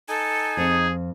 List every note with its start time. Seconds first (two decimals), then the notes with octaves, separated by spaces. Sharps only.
0.09 D#4 A4 G#5
0.57 F2 G#4